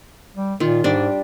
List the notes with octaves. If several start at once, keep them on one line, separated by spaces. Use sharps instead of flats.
G3
A#2 D#3 F4
G#2 G3 D4